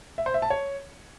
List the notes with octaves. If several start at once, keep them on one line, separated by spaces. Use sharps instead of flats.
E5
C5
E5
A5
C#5